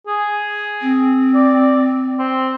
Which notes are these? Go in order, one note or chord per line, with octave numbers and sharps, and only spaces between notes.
G#4
C4
D5
C4